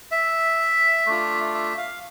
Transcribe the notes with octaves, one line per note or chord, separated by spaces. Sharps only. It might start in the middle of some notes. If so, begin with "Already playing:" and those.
E5
A3 D4 F4
E5
F5